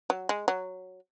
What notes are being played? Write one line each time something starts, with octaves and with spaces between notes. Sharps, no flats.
F#3
G#3
F#3